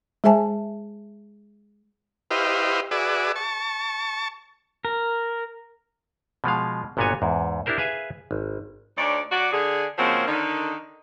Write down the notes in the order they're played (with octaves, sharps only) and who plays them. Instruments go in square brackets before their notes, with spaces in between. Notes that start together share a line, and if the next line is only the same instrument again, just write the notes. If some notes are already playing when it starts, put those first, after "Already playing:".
[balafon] G#3 G#4 C5 E5 G#5 A5
[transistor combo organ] E4 G4 B4 C5 D#5 F5
F#4 G#4 B4 D5 E5
A5 C#6
[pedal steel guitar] A#4
[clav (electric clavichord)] B2 F3 G#3 F5
G1 A#2 B3 F#4 C#5 G#5
E2 G#2
D4 E4 G4 A#4 C5
G#4 B4 E5 F5 G#5
G#1
[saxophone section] D2 D3 D#4 C#5 D5
F#3 F#4 D5
D3 G#4
C#3 F3 F#3 G#3 A#3 C4
D3 D#3 D#4